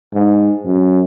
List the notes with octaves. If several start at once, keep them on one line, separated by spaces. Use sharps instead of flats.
G#2
F#2